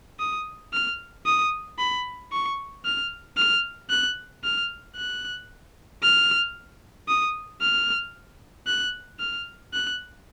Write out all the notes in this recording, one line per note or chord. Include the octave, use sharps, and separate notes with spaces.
D#6
F6
D#6
B5
C#6
F6
F6
F#6
F6
F#6
F6
D#6
F6
F#6
F6
F#6